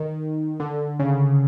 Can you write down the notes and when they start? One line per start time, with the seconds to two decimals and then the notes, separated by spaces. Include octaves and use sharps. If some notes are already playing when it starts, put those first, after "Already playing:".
Already playing: D#3
0.60 D3
0.99 C#3